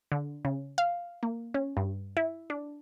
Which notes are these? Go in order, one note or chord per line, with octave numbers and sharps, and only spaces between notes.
D3
C#3
F5
A#3
C#4
G2
E4
D4